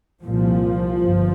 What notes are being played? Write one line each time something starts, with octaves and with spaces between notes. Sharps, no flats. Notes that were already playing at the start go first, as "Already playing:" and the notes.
C2 A#2 F3
G2
G1